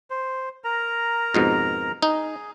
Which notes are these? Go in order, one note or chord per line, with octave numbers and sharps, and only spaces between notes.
C5
A#4 A#5
F2 G#2 B2
D#4 G#4